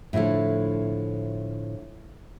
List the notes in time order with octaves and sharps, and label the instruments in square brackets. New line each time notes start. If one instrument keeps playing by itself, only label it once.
[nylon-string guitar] A2 D3 F3 E4 A4